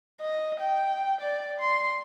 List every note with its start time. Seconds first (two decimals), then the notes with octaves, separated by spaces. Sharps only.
0.21 D#5
0.60 G5
1.21 D5
1.61 C6